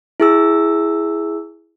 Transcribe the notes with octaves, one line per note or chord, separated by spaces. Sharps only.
E4 G#4 E6